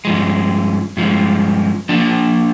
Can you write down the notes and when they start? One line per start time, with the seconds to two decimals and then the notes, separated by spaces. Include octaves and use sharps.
0.05 G2 F3 G#3
0.97 G2 F3 G#3
1.89 F3 A#3 D4